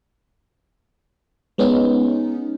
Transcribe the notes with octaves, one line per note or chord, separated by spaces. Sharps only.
G#3 B3 C#4 D#4